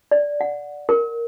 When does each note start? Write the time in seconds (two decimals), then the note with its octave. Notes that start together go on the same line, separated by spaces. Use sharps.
0.11 D5
0.41 F#5
0.89 A#4